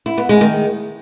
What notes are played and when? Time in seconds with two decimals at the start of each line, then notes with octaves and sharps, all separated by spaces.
0.06 E4
0.18 B3
0.29 G#3
0.41 D#3